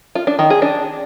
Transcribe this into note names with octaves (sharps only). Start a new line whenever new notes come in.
F4
D4
D#3
G#4
D4